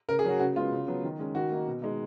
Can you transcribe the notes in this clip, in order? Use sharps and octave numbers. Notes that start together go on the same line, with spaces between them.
C#3 A#4
G#4
F#3 C#4 F#4
C#3 F#4
G#3 B3 F4
C#3
F#3 B3
D#3
G#3 C#4
D#3 F#4
A#3 D#4
B2
G#3 D#4